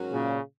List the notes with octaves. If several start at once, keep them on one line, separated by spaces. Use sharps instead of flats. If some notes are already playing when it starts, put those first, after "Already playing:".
Already playing: G#2 F#3 C#4 F#4 A#4
A#2 C#3